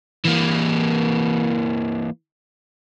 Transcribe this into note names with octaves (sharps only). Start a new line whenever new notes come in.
E3 A#3